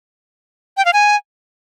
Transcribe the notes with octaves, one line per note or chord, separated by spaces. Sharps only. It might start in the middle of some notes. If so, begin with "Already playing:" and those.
G5
F5
G#5